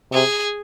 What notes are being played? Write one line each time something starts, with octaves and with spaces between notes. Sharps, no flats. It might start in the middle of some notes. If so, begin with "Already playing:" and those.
C3 G#4